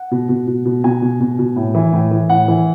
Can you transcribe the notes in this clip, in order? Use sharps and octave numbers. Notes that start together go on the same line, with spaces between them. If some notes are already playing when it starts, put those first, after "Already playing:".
Already playing: F#5
B2
B2
B2
B2
B2 G#5
B2
B2
B2
A2
E3
A2
E3
A2 F#5
E3